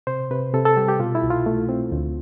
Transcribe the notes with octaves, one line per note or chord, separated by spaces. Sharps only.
C3 C5
C3 B4
C3 A4
A4
G3 G4
G4
B2 F4
E4
C2
F4
A3
C4
D2